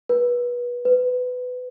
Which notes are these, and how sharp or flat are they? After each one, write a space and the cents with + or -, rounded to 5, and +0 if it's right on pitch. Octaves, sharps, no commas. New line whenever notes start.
B4 -25
B4 +20